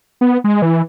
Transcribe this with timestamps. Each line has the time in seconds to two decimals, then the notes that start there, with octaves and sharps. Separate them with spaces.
0.21 B3
0.44 G#3
0.62 E3